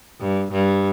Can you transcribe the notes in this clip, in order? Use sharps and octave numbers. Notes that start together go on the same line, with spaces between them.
G2
G2